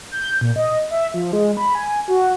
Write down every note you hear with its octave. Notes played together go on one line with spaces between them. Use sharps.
G6
A#2
D#5
E5
F3
G#3
B5
G#5
F#4